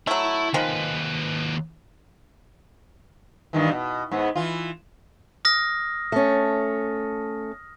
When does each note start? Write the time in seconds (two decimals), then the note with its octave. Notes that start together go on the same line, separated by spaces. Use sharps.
0.07 F#3 A3 E4 B5
0.54 D#2 D#3 F3 G#3 B4
3.53 G2 D#3 E3
3.71 B2
4.11 G#2 B3
4.36 E3 F4
5.45 D#6 F6 A#6
6.12 A3 C#4